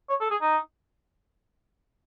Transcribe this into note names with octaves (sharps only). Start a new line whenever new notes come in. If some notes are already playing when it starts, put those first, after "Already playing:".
C#5
A4
G#4
D#4